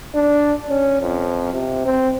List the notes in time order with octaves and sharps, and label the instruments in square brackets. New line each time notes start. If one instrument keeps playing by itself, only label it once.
[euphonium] D4
C#4
F2
C3
C4